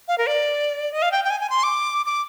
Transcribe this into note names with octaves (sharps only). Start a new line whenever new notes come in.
F5
A#4
D5
D#5
F5
G5
G5
G#5
G#5
C6
D6
D6